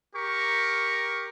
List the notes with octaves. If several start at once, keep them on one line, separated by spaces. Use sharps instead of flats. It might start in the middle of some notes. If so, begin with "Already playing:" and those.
G4 A#4 C#6